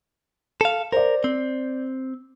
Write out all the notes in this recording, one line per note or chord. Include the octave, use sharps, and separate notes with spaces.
A4 F5
A#4 C5 D5
C4